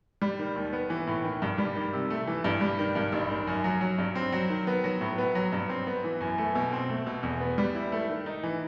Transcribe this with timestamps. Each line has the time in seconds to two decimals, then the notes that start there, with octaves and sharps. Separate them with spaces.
0.22 G3
0.39 D#3
0.56 D#2
0.73 B3
0.90 E3
1.07 A2
1.24 D#3
1.42 G2
1.58 G3
1.75 D#3
1.93 C3
2.10 A3
2.27 E3
2.44 G2
2.61 G3
2.79 D#3
2.95 G2
3.12 A1
3.30 D#3
3.47 F#2
3.64 F#3
3.81 F#3
3.98 G2
4.15 C4
4.32 F#3
4.50 D#3
4.67 B3
4.84 F#3
5.01 A2
5.18 B3
5.35 F#3
5.52 G2
5.69 C4
5.87 B3
6.04 E3
6.21 F#2
6.38 A3
6.55 B2
6.73 C4
6.89 A3
7.06 B2
7.23 E2
7.40 B3
7.58 G3
7.75 E4
7.92 A3
8.10 D#3
8.26 D#4
8.43 E3